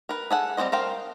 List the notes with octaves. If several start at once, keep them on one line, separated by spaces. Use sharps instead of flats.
A#4 B4
G#4 A4 F#5
G3 C4 G#4 C5 D#5
A#4 C5 F5 G5